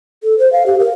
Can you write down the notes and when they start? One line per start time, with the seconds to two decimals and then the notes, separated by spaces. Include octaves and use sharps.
0.23 A4
0.38 C5
0.53 F5
0.66 G4
0.79 A#4